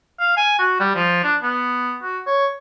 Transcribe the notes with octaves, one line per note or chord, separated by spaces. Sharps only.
F5
G#5
F#4
G3
F3
D4
B3
F#4
C#5